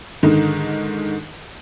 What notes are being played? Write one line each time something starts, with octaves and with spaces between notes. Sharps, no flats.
G#2 D3 D#3 D#4